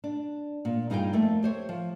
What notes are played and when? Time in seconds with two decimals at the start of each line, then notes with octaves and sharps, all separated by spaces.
0.04 D4
0.65 A#2
0.90 G2 D#4 F4 G#4 F5 G5
1.13 F2 A3 A#3
1.43 G4 C5 C#5
1.69 F3